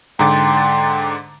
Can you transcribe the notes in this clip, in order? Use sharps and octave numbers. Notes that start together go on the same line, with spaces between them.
G#2 D3 G5 A#5 C6 D6 A6